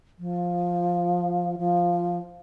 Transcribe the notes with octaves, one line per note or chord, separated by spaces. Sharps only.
F3
F3